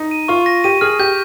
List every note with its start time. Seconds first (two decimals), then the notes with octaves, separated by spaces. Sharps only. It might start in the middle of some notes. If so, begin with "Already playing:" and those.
Already playing: D#4
0.11 D#7
0.28 F4 C#6
0.46 A#6
0.64 G4 D#7
0.81 G#4 F6
0.99 G4 G6